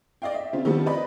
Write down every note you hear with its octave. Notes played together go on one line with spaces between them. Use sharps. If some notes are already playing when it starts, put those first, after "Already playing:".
D5 D#5 F5 G5
E5
C#3 C4 F4
D#3 F3 G3 B3 C4
B4 D5 D#5 B5